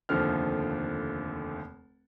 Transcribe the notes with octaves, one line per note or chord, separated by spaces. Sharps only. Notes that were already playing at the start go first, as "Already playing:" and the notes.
F1 D#2 D3 F3 F6